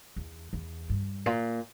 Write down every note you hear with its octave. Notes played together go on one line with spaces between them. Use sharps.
E2
E2
G2
A#2